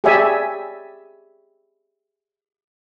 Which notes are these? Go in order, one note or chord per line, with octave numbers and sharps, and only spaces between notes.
G4 G#4 C#5 D5 E5 G#5